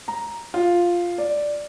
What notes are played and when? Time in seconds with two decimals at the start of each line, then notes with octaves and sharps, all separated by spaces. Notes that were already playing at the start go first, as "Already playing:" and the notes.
0.08 A#5
0.54 F4
1.18 D5